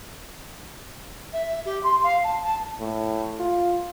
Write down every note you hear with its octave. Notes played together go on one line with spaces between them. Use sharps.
E5
G4
C6
F5
A5
A5
A2
F4